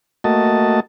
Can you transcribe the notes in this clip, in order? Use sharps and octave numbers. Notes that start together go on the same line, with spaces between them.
A3 A#3 F#4 D#5 A5